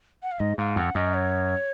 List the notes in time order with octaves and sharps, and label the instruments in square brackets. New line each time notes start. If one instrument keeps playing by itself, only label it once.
[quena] F#5
F5
[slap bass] G#2 [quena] D#5
[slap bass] G#2 [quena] F5
[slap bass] F2 [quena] F#5
[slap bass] F#2 [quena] D#5
[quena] C#5